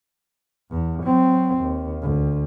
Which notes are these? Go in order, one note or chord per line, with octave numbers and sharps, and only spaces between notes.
E2
F#3 C4
D#2
D2